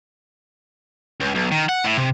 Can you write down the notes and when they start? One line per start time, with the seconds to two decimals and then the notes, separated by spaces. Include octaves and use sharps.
1.20 C#2
1.35 B1
1.51 D#3
1.69 F#5
1.85 A2
1.98 C3